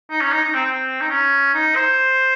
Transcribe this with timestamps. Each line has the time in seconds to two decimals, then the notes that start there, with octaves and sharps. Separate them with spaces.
0.11 D#4
0.21 C#4
0.32 D#4
0.43 D#4
0.54 C4
0.66 C4
1.01 D#4
1.10 C#4
1.54 D#4
1.76 C5